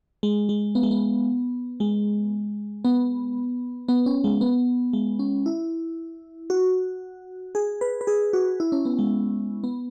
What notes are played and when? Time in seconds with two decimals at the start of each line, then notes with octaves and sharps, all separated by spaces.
0.23 G#3
0.49 G#3
0.75 B3
0.83 G#3
0.91 B3
1.80 G#3
2.85 B3
3.88 B3
4.06 C#4
4.24 G#3
4.41 B3
4.93 G#3
5.19 C#4
5.46 E4
6.50 F#4
7.55 G#4
7.81 B4
8.01 B4
8.07 G#4
8.33 F#4
8.60 E4
8.72 C#4
8.85 B3
8.99 G#3
9.64 B3